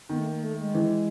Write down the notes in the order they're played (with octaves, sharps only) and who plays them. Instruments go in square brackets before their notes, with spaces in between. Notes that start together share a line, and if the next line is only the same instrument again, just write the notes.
[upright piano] D#3 [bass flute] B3
[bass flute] A3
A#3
A3
G#3
[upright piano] E3